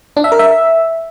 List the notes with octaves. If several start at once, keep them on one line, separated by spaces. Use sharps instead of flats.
D4
E5
A#4
E5